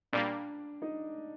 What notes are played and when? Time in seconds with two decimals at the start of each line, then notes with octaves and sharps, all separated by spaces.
0.13 A#2 G3 A#3 D4 D5
0.82 D#4 D#5